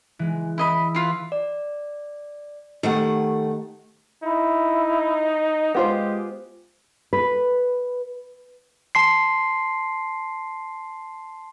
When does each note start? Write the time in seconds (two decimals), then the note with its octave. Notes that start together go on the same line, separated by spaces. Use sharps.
0.19 E3 G#3
0.58 E4 D#5 B5
0.95 E4 F4 B4
1.32 D5
2.83 D#3 A3 D#4 G4 F#5
4.24 D#4 E4
5.75 G#3 B3 F4 G4 C5
7.13 B4
8.95 A5 C6 C7